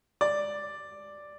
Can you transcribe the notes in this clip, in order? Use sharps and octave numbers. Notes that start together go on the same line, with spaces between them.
D5